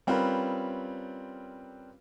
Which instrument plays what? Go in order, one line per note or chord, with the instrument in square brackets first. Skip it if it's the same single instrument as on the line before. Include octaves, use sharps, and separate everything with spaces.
[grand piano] G3 C4 C#4 F4 A#4 B4